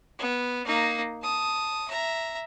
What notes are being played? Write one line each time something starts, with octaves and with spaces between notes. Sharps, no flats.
B3
A#3 D#4
A5 D#6
E5 A#5